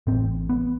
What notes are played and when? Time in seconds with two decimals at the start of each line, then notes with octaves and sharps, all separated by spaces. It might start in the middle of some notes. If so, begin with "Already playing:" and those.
0.07 A1 A2 C4
0.49 B3